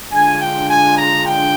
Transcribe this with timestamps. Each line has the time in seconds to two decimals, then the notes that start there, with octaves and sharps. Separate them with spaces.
0.12 D3 G#3 D4 F4 G#5
0.41 G5
0.69 G#5
0.97 A#5
1.26 G5